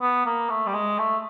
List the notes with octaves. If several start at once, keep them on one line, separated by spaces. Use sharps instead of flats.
B3
A#3
A3
G3
G#3
A3